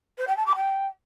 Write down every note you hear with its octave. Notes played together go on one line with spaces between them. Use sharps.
C5
G5
A5
D6
G5